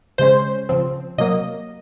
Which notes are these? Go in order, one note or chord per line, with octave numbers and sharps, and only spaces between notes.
C#3 G#3 C#4 C5
C#3 F3 C4
C3 F#3 A#3 D#5